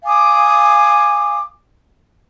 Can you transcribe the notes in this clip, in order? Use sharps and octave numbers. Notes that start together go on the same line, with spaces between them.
F5 G#5 D6 D#6